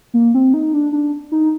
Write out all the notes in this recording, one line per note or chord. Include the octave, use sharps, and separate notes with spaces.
A#3
C4
D#4
D4
D4
D#4